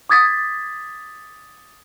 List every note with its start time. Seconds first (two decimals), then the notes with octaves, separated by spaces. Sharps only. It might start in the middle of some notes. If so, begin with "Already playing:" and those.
0.09 D6 D#6 G#6 A6 B6